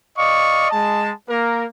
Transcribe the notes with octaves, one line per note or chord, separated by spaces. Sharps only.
D5 D#5 F5 C#6
G#3 A5
A#3 A#4